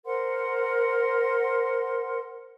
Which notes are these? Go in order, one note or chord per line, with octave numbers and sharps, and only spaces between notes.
A#4 C5 F#5 C6